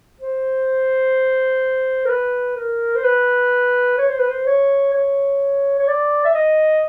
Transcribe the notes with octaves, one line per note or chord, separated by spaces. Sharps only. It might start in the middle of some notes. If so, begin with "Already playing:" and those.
C5
A#4
B4
A#4
C5
B4
C#5
C5
B4
C5
C#5
C#5
C#5
D5
E5
D#5